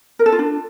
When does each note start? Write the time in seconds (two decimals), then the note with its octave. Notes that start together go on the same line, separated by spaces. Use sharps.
0.19 A#4
0.26 A4
0.32 F4
0.39 D4